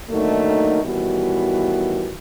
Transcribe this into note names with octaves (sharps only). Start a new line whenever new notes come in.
D3 D#3 F#3 A3 A#3 D#4
A2 D#3 E3 G3 B3 F#4